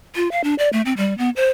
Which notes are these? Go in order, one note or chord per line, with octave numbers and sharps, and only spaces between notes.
F4
F5
D4
D5
A3
C4
G3
B3
C5